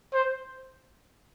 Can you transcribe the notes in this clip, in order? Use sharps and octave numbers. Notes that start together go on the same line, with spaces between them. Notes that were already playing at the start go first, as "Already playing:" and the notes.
C5